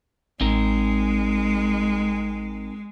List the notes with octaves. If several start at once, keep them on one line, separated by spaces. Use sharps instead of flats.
A1 G#3 C4 D#4 A#4